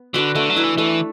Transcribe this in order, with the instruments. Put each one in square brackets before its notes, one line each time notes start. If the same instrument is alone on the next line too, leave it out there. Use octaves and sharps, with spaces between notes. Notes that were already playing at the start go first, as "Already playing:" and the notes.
Already playing: [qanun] B3
[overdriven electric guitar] D3 [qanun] D4 F#4 B4
[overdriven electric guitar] D3 [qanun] A3
[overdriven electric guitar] F#3
[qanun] E4 B4
[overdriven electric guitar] E3
[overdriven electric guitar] E3 [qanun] A3